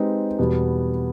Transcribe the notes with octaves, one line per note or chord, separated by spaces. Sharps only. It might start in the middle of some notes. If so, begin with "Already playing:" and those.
Already playing: G#3 C4 D#4 G4 B4
E2 B2 G3 B3